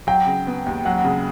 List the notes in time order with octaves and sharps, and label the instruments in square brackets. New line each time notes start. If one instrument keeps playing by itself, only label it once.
[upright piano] F#3 [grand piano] G5
[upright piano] C#3
B3
D#2
[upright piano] F#3 [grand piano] F#5
[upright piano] C#3